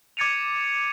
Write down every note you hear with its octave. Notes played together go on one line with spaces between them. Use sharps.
D6 G#6 A6 C#7 D#7 F7